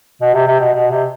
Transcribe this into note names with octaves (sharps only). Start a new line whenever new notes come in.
B2
C3
C3
B2
B2
C3